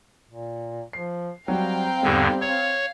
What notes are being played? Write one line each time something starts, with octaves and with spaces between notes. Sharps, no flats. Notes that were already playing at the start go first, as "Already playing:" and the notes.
A#2
F3 C7
F#3 G3 C4 F5 G5 A#5
E2 G#2 D3 G3 G4
C#5 F5 G#6